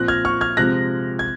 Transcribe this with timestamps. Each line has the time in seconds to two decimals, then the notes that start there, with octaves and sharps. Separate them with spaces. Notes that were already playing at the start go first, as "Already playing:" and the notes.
Already playing: A#2 F3 C4 F#6 A#6
0.08 F6 G#6
0.25 C#6 F6
0.41 F6 G#6
0.57 C3 F3 G#3 C4 F#6 A#6
1.19 G#6